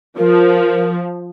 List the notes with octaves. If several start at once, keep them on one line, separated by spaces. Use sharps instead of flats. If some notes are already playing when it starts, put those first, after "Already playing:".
F3 A#4